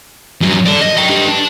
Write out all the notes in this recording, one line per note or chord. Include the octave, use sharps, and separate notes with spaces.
G2 F#3
A4 D5
D#5
D#5 G5
D4 G4
D4